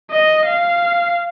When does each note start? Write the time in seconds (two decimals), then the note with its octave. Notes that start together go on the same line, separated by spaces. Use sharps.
0.12 D#5
0.46 F5